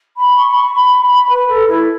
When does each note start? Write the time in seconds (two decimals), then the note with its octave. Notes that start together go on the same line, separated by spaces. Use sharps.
0.17 B5
0.36 C#6
0.48 B5
0.54 C#6
0.73 B5
1.02 B5
1.30 B4
1.48 A4
1.68 E4